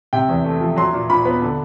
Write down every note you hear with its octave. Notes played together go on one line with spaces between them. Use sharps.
C3 G5
E2
A3
F3
F#3 C6
A#2
A#2 B5
B3
D3